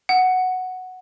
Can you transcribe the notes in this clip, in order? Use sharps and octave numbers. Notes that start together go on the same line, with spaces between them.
F#5